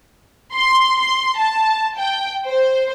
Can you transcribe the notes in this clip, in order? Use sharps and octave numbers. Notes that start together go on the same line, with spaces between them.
C6
C6
A5
G5
C5